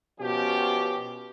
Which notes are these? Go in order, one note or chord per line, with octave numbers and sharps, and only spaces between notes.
B2 F3 C#4 G4